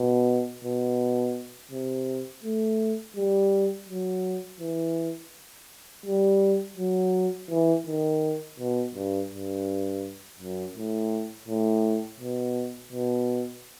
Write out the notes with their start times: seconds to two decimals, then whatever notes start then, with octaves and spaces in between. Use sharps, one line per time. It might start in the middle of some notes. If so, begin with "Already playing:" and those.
Already playing: B2
0.64 B2
1.71 C3
2.44 A3
3.16 G3
3.88 F#3
4.60 E3
6.06 G3
6.77 F#3
7.49 E3
7.87 D#3
8.59 B2
8.95 G2
9.31 G2
10.39 F#2
10.75 A2
11.48 A2
12.20 B2
12.93 B2